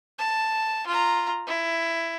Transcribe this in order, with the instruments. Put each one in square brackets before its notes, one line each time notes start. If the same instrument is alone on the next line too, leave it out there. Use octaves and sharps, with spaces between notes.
[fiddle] A5
F4 A#5
E4